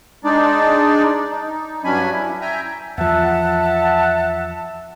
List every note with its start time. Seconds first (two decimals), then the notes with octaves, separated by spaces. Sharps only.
0.24 G#3 D4 D#4 D5
1.30 D#4
1.84 G2 F#3 C#4 D4 G#5 B5
2.12 E4
2.41 E5 G5 G#5 A#5
2.98 E2 F3 E5 F#5 A5